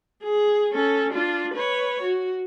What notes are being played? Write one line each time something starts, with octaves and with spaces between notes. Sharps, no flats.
G#4
C#4 A4
D4 F4
B4 C#5
F#4